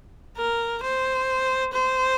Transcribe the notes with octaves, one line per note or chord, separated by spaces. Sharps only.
A#4
C5
C5